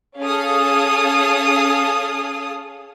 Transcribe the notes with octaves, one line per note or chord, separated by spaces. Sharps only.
C#4 G#4 A4 F5 D#6